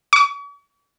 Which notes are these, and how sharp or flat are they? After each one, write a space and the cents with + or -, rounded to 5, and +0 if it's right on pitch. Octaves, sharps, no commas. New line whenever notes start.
C#6 +45